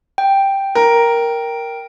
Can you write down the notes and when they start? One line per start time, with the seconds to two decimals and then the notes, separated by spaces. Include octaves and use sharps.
0.18 G5
0.75 A#4